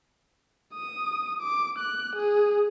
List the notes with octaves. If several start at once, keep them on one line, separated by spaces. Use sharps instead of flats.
D#6
D6
F#6
G#4